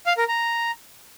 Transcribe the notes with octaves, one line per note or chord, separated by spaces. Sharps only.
F5
A#4
A#5